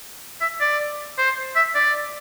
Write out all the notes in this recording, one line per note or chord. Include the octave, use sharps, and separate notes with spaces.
E5
D5
C5
E5
D5